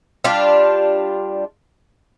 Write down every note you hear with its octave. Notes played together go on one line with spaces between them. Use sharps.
G3 D4 F4